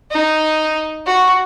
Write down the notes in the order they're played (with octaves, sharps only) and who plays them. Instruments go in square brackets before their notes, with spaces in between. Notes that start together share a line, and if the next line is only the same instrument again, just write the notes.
[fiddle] D#4
F#4